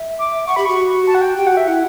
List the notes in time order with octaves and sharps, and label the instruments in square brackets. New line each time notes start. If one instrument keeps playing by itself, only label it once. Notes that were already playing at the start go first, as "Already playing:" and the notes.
Already playing: [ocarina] E5
[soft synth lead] D6
[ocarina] F#5 [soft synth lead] C#6
[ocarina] G4 [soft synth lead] B5
[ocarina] F#4 [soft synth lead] C#6
[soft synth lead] A5
F#5
G5
[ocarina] G4 [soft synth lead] G5
[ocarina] F#4 [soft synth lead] F#5
[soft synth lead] E5
[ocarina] E4 [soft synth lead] F#5